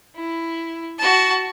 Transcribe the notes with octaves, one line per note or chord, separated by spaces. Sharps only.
E4
F#4 A5